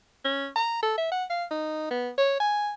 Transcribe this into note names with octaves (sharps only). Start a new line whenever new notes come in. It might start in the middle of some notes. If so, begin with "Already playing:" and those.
C#4
A#5
A4
E5
F#5
F5
D#4
B3
C#5
G#5